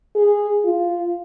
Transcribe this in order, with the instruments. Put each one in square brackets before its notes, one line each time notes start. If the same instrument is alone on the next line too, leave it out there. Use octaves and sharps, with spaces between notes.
[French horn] G#4
F4